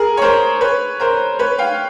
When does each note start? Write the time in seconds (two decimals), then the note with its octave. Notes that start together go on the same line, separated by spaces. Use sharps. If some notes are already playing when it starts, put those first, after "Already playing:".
Already playing: G#4 A#4
0.17 C#5
0.22 A#4 C5
0.61 B4 C#5
1.00 A#4 C5
1.39 B4 C#5
1.58 F5 G5